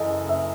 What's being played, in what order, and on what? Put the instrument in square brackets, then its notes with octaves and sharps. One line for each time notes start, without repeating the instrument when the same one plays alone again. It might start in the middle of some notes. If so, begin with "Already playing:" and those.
Already playing: [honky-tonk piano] F#2 C#3 E3 [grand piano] G#4 A4 D#5
[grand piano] E5